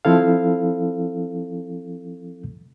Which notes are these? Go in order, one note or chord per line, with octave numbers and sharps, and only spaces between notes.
F3 C4 E4 A4 F5